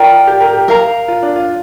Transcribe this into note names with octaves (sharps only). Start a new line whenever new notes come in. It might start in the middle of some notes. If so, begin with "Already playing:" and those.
Already playing: F4 A#4 D5 G5
G4
A#4
G4
A#4 F5 A#5
F4
D4
F4